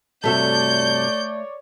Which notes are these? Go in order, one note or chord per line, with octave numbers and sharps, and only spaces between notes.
G2 C3 A3 F#4 A4 C#5 D5 G6